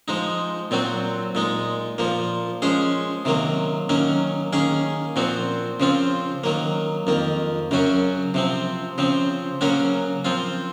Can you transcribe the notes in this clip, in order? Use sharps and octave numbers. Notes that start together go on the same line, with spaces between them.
F3 G#3 D#4
A#2 F#3 C4 F#4
A#2 G#3 D#4
A#2 F3 A#3
F3 G#3 C#4 G#4
C3 D#3 F#3 A#3
D#3 F#3 A#3 C#4
D#3 A#3 C#4 G#4
A#2 F3 C4 F#4
C#3 F3 C4 F4
D#3 F#3 A#3
F2 D#3 A#3
F#2 C#3 F#3 C#4 F#4
C3 F3 C4
C#3 F3 C4
C#3 F#3 A#3 C#4 F#4
F3 C4 F4